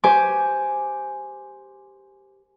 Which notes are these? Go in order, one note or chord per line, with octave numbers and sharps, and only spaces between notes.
G4 C5 G#5 D6